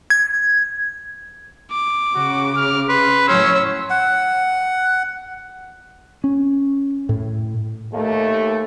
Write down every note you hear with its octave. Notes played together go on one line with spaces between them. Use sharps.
G#6
D6
C#3 F#4
F6
B4 C6
A2 F#3 C#4 C#5 C6 E6
F#5
C#4
A2
D#2 A3